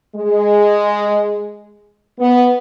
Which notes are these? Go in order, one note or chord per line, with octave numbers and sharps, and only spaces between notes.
G#3
B3